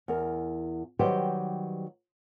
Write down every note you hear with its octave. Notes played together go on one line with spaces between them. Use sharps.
E2 A#4
D#3 F#3 G3 G4 B4 C5